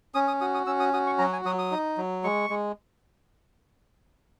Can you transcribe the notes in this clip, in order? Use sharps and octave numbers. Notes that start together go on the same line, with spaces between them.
C#4 D#6
D#6
F#4 D#6
D#6
C#4 E6
D#6
F#4 D#6
C#6
F#3 A#5
G#5
F#3 D#6
D#6
D#4
F#3
G#3 C#6
G#3